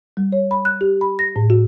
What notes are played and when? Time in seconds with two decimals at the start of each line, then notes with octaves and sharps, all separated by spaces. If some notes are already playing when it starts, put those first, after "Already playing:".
0.17 G3
0.32 C#5
0.51 B5
0.65 F#6
0.81 G4
1.01 B5
1.19 A#6
1.36 A2
1.50 F#4